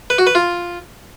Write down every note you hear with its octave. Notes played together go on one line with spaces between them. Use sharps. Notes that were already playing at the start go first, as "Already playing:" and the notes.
B4
F#4
B4
F4